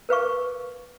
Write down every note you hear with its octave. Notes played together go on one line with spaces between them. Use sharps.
A#4 B4 F5 C#6